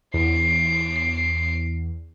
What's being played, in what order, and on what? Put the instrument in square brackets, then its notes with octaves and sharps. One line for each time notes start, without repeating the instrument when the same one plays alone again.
[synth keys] E2 [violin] C7 D7